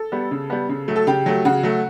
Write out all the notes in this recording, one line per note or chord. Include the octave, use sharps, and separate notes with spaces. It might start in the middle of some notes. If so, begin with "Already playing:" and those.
Already playing: A4
G3 B3
C#3
G3 B3
C#3
F#3 A3
A4
C#3 G4
F#3 A3
C#3 F#4
F#3 A3